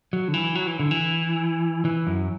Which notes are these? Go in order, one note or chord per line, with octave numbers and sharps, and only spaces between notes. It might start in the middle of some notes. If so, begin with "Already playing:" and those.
F#3
D3
E3
F#3
E3
D3
E3
E3
F#2